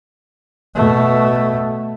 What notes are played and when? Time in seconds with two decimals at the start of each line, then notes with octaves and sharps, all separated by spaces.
0.75 B2 A3